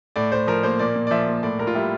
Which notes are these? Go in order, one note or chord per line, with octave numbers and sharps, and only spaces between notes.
A2 D5
A2 C5
F3 A#4
A#3 C5
A#2 D5
A#2
D5
F3 E5
A#3
A2 D5
A2 A#4
F4
G3 E4